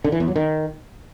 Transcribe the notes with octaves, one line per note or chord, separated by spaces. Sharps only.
D3
E3
E2
F#3
D#3